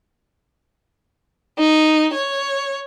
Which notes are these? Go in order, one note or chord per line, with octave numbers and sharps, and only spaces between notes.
D#4
C#5